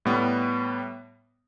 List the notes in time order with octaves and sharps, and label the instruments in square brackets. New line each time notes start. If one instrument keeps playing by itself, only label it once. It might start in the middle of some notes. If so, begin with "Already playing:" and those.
[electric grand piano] A2 G3 B3